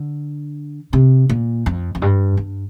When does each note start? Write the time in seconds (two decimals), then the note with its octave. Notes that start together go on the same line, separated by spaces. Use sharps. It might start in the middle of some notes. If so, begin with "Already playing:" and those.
Already playing: D3
0.93 C3
1.29 A#2
1.66 F2
1.95 F2
2.02 G2
2.37 G2